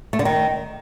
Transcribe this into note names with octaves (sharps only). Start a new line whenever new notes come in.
A3
D3
D#3